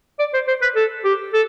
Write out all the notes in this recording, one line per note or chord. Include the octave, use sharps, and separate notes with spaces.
D5
C5
C5
B4
A4
G4
A4